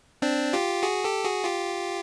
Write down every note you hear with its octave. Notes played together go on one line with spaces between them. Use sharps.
C4 D4
F4 G4
F#4 G#4
G4 A4
F#4 G#4
F4 G4